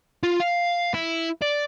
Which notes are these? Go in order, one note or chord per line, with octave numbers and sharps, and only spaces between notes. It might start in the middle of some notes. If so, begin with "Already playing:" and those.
F4
F5
E4
D5